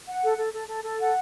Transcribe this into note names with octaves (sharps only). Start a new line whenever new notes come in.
F#5
A4
A4
A4
A4
A4
F#5